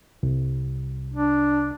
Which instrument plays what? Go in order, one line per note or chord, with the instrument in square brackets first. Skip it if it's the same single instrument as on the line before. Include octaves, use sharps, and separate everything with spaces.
[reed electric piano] C2
[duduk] D4